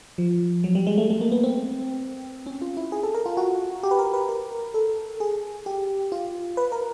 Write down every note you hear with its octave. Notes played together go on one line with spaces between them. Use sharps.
F3
F#3
G3
G#3
A3
A3
A#3
B3
C4
C#4
F4
E4
G#4
A4
A#4
F4
F#4
G4
B4
A#4
B4
A#4
A4
G#4
G4
F4
B4
A#4